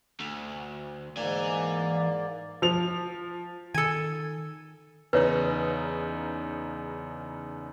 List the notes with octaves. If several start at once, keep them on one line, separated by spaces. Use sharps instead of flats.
D2
G#2 E3 A#3 D5 G#5
F3 F7
D#3 A4 G#5
E2 C#3 D#4 B4 C#5